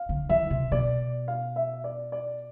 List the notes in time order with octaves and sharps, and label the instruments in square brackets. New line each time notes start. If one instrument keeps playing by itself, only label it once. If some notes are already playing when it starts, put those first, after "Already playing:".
Already playing: [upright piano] F5
[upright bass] D3
[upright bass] E3 [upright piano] E5
[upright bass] C3
[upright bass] B2 [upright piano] D5
[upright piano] F5
E5
D5
D5